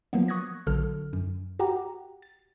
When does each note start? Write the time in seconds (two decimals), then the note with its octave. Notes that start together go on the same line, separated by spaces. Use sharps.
0.13 F3 F#3 A#3 B3
0.28 C#6 D#6 F#6 G#6 A#6
0.67 A#1 D3 F#3 A4 F6
1.13 F#2
1.59 F#4 G4 F#5 G5 A#5 D6
2.22 A6